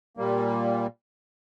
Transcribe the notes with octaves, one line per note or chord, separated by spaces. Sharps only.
A#2 G3 A#3